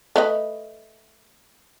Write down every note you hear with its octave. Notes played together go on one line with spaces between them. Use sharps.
A3 B4 D#5